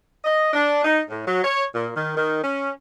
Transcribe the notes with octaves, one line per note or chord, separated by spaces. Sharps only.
D#5
D4
D#4
A2
F#3
C#5
A#2
D#3
D#3
C#4